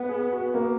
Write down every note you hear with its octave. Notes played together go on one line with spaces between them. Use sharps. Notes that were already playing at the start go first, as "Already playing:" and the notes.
Already playing: B3 F#5
G#4
F#4
A#3